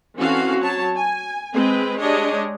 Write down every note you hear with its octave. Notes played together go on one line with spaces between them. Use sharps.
E3 C4 C#4 F#4 A4 F5
F#3 C#5 A5
G#5
G#3 C4 B4
G#3 D4 G4 C#5 D#5